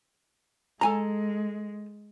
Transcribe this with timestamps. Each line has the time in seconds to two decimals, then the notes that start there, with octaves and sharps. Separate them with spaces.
0.81 G#3 A4 G#5 A#5